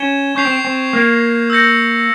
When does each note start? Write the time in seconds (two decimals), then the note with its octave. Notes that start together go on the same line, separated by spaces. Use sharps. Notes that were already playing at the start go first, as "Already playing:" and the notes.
Already playing: C#4 G#6 E7 G7
0.35 C#4 C#6 G6 C7 F7
0.45 C4
0.65 C4
0.93 A#3
1.50 E6 G6 A#6 C#7